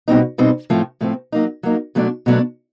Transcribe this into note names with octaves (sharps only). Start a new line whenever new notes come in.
B2 G3 C4 D#4
B2 G3 C4 D#4
A2 F3 A3 C4
A2 F3 A3 C4
F#3 A#3 D#4
F#3 A#3 D#4
B2 F#3 A3 D4
B2 F#3 A3 D4